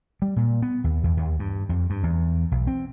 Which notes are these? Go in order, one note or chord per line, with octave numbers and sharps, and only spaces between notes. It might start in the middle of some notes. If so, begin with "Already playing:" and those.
G3
A#2
B3
D#2
E2
D#2
G2
F2
G2
E2
B1
C4